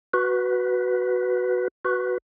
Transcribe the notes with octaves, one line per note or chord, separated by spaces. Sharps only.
F#4 B4
F#4 B4